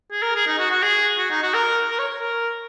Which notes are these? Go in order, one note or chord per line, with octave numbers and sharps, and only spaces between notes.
G#4
A#4
G#4
D#4
F#4
F#4
G#4
F#4
D#4
F#4
A#4
A#4
C#5
A#4